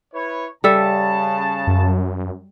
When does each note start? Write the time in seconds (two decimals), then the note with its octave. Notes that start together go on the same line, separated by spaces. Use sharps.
0.14 E4 B4 C#5
0.64 C#3 G3 A4 E5 A5
1.67 F#2